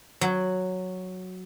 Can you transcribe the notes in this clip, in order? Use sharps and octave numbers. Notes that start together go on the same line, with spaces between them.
F#3